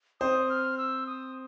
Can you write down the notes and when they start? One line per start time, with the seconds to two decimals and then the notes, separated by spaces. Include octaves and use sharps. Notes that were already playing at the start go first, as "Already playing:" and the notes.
0.21 C4 C5 D#6
0.49 F6
0.78 E6
1.07 D#6